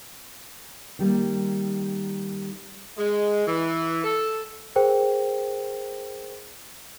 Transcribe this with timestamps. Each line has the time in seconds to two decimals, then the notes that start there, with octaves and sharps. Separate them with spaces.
0.99 D#3 G3 A#3
2.97 G#3
3.47 E3
4.04 A4
4.76 G#4 A#4 C5 G5